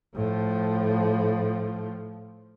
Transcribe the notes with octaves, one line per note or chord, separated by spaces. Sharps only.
A2 F3